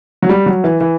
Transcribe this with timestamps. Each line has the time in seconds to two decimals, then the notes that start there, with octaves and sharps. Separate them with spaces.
0.22 F#3
0.29 G3
0.46 F#3
0.64 E3
0.81 E3